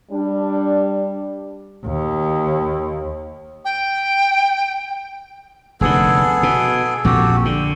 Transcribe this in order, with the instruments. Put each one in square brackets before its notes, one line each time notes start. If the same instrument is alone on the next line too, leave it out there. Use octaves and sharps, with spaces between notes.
[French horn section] G3 D4
[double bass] D#2
[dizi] G5
[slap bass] F1 D#2 D3 [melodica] B3 G#4 A4
[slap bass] B2
[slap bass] A#1 F2 A#2 [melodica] F#4 G4 A4
[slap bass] D3 [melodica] G5